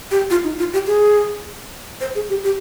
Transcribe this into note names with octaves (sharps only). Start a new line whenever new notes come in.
G4
F4
D#4
F4
G4
G#4
C5
G#4
G4
G4